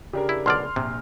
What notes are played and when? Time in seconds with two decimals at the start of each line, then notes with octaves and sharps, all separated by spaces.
0.13 C#3 D4 G4 A#4
0.29 E4
0.46 B1 D3 D5 C6 F6
0.76 A#1 C3